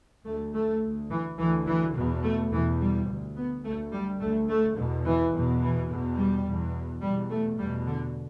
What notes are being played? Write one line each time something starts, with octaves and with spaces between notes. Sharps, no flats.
D2 A3
A3
D2
E3
D2 E3
E3
E2 B2
A3
E2 B2 E3
G3
D2
B3
D2 A3
G3
D2 A3
A3
E2 B2
E3
E2 B2
E3
E2 B2
G3
E2 B2
E2 B2 G3
A3
E2 B2 G3
D3